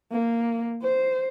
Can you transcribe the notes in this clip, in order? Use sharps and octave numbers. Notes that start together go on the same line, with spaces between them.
A#3
C5